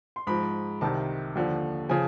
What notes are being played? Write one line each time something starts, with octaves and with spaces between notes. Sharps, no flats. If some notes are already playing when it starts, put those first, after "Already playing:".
C6
G#2 F3 B5
C2 C3 D#3 A5
D#2 D3 F3
C#3 F3 G#5